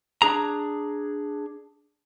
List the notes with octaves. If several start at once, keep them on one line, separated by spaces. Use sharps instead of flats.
D4 G#4 A#5